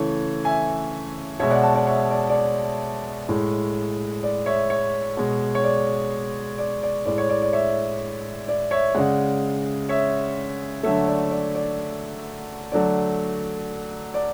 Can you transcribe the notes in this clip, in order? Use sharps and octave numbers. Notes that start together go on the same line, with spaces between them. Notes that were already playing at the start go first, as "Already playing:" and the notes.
Already playing: C#3 E3 A3 C#5
E5 G#5
B2 G#3 C#5 E5
D5 F#5
F#5 A5
D5 F#5
C#5 E5
D5
D5
C#5
A2 G#3
D5
C#5 E5
C#5
B2 G#3
C#5
D5
D5
D5
A2 G#3 D5
C#5
D5
D5
C#5 E5
D5
C#5 E5
C#3 G#3 D5 F#5
C#5 E5
D3 F#3 A3 C#5 E5
D5
D5
D5
D3 F#3 A3 D5
D5